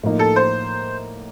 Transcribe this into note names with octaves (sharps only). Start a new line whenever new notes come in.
A2 F3 A#3 D#4
A4
C5